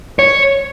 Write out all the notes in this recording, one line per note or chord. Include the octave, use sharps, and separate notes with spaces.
C#5